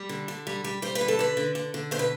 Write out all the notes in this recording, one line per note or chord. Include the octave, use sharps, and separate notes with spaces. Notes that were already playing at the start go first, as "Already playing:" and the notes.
Already playing: G3
D3
D3
G3
G3
G3 C5
B4
D3
A4
D3 B4
D3
D3
D3
B2 C5
B4